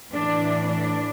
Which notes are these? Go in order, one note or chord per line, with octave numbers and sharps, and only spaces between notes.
A2 E3 D4
D4